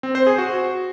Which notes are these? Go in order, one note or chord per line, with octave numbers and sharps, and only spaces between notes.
C4
C5
G#4
F#4